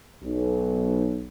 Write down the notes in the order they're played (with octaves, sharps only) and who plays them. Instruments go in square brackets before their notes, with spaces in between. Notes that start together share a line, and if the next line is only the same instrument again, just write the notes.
[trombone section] B1